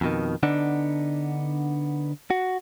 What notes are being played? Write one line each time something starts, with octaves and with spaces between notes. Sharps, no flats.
F2 B2 D#3
D3 B3 D4 D#4
F#4